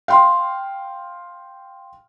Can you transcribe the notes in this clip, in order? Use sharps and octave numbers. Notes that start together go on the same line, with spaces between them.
F5 G5 C6